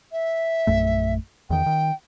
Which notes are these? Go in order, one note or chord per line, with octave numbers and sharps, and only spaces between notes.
E5
A#1 F#2 A3
E2 D#3 G5
D#3